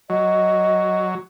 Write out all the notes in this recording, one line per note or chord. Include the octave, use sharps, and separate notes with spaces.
F#3 D#5